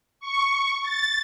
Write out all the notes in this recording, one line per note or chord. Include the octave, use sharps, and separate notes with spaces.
C#6
A6